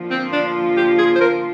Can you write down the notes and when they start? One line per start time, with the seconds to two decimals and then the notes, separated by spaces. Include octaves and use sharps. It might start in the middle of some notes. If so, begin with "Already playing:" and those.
Already playing: D3 F3 A#3 F4
0.11 C4
0.33 D4
0.77 G4
0.98 G#4
1.15 C5
1.21 A#4